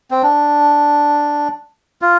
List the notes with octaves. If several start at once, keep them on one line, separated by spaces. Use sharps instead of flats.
C4
D4
F4